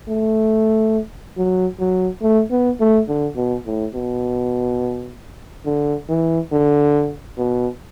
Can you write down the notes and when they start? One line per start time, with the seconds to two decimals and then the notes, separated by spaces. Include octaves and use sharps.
0.08 A3
1.37 F#3
1.79 F#3
2.22 A3
2.51 B3
2.80 A3
3.08 D3
3.36 B2
3.66 A2
3.94 B2
5.66 D3
6.09 E3
6.52 D3
7.38 B2